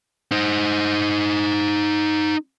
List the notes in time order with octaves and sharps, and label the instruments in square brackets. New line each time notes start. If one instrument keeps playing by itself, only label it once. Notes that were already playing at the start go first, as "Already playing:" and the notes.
[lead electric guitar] D#4 C5